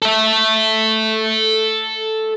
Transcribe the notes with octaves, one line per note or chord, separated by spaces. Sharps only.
A4 E5